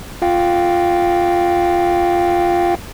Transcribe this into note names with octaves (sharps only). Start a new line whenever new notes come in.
F4 F5 G5